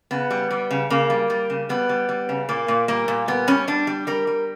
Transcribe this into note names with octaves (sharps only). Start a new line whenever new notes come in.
C#3 B3
G3
G3
C#3
C#3 A#3
G3
G3
C#3
G3 B3
G3
G3
C#3
A#2 A#3
A#2
G3 A#3
A#2
G3 B3
G3 C#4
G3 D4
G3
G3 A#4
G3